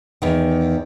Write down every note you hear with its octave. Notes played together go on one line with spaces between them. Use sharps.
E2 D#3